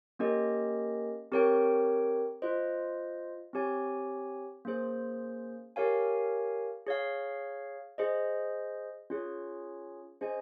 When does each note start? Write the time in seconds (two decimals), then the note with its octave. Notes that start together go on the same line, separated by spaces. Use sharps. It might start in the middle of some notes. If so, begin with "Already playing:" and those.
0.19 A#3 C#4 G4 A#4 D#5
1.32 C4 G4 A#4 C#5 G5
2.42 F4 C5 D#5
3.53 C4 G4 C#5 G#5
4.65 A#3 C#4 G#4 C5
5.76 G4 A#4 C#5 F5 G#5
6.87 G#4 C#5 F5
7.98 G#4 C5 D#5
9.10 C#4 F4 G#4 C#5
10.21 C#4 G#4 C5 D#5 G#5